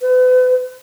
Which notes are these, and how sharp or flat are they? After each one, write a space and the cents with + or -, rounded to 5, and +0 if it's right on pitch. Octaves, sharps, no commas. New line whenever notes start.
B4 +40